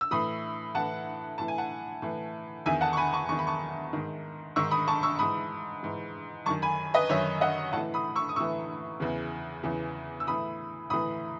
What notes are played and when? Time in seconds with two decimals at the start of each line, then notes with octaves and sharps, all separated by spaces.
0.01 E6
0.11 A2 E3 B5 D#6
0.75 A2 E3 F#5 A5
1.38 A2 E3 A5
1.48 G#5
1.58 F#5 A5
2.02 A2 E3
2.66 E2 D#3 E5 G#5
2.81 F#5 A5
2.93 C#6
2.97 G#5 B5
3.13 A5 C#6
3.29 E2 D#3 C#6
3.39 B5
3.47 A5 C#6
3.93 G#2 D#3
4.56 G#2 D#3 C#6 E6
4.71 B5 D#6
4.88 A5 C#6
5.03 C#6 E6
5.19 G#2 E3 B5 D#6
5.83 G#2 E3
6.46 F#2 D#3 A5 C#6
6.62 G#5 B5
6.94 B4 D#5
7.09 F#2 D#3 C#5 E5
7.41 D#5 F#5
7.73 A2 E3 F#5 A5
7.94 B5 D#6
8.16 C#6 E6
8.29 D#6
8.36 A2 E3 C#6 E6
9.00 E2 C#3 E3
9.63 E2 C#3 E3
10.20 E6
10.27 A2 E3 B5 D#6
10.90 A2 E3 B5 D#6